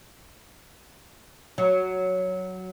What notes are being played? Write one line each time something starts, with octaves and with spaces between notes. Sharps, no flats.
F#3